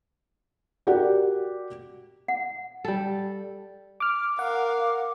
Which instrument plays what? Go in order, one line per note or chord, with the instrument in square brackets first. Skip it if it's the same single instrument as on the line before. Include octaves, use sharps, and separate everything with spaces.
[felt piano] F#4 G4 A#4 D5 F#5
[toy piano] F#5
[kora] G3 A4
[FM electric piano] D6 F6
[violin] A#4 F5 [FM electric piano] F#5 D6